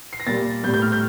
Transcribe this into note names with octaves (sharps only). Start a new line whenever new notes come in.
C7
A#6
A#2 G3 A6
A2 G3 G6
G6
F6
G6